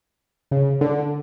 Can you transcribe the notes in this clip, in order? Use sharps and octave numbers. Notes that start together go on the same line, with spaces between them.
C#3
D3